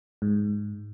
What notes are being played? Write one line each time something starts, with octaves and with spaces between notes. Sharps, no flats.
G#2